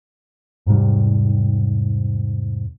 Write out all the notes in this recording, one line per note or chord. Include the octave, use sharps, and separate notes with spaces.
E2 G#2 C3 G3